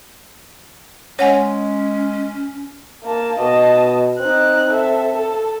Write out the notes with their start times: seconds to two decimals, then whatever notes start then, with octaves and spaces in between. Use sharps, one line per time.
1.19 G#3 C#4 C#5 F#5 G#5
3.03 A#3 A5
3.39 B2 D#5 A5
4.20 C4 D#4 F#6
4.70 A4 E5
5.15 A4